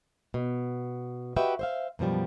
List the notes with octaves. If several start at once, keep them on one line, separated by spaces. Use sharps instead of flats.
B2
F#4 G4 B4 D#5 E5 G5
C5 E5 F5
F#2 B2 F3 G3